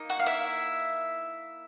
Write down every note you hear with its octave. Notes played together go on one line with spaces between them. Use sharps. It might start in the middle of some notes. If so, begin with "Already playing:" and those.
Already playing: A#3 D#4
F#4 F#5
F5
E4 E5